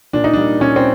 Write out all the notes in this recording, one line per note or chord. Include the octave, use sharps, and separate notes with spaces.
A#2 D4
D#4
D4
G3 A#3
A#2 C#4
C4